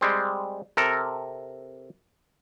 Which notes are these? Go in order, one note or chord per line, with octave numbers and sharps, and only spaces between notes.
G3 G#3 C4
C3 A4 A#4